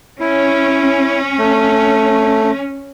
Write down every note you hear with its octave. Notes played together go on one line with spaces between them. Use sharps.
C#4 E4
A3